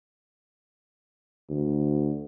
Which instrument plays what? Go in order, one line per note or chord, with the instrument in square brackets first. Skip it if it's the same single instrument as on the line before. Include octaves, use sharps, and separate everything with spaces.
[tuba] D2